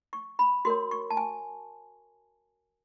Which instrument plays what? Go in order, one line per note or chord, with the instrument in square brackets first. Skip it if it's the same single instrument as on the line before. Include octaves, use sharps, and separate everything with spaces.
[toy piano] C#6
B5
F#4 A#4 C#5 C6
C#6
A5
G#5